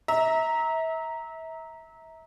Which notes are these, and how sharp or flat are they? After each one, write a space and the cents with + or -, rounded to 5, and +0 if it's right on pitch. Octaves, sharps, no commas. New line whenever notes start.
E5 -30 A#5 +0